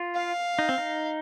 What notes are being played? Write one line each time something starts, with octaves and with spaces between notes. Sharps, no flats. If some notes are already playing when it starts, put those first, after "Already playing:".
Already playing: F4
F5
D#4
C4
D#4